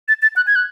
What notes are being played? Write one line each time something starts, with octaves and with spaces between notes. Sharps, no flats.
A6
A6
F#6
G#6
F#6